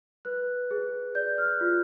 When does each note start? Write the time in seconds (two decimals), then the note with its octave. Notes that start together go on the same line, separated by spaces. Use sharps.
0.25 B4 F#6
0.71 G#4
1.15 D5 G6
1.38 F6
1.45 F#6
1.61 F4